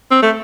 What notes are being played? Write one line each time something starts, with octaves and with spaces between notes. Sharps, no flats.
C4
A3